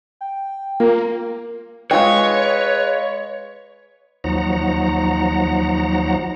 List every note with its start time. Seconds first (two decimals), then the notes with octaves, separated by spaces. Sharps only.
0.21 G5
0.80 A#3 F4 A#4
1.91 G#3 F4 B4 C#5 D#5 F5 G5
4.24 D#2 F3 F#3 D#4 F#5 A#5